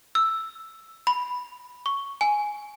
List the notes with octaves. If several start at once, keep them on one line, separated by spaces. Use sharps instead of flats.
E6
B5
C#6
G#5